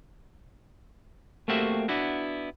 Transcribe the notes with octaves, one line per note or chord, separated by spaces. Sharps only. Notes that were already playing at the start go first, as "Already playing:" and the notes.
A3 A#3 C4 F#4 G4 E5
B3 D4 E4 F#4